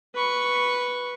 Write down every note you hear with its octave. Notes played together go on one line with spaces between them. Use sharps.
B4 C#6